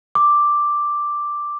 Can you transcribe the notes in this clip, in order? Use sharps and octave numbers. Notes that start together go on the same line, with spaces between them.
D6